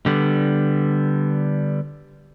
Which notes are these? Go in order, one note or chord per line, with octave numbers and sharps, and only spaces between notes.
D3 G3 B3